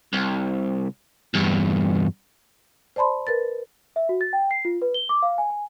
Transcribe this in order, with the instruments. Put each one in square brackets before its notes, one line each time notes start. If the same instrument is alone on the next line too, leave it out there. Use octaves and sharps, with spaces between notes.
[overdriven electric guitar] C2
E2 G2
[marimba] C5 D5 A5 B5 C6
A#4 B4 A6
[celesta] E5
F#4
A6
G5
C7
F4
B4
G7
D6
F5
G#5
G#5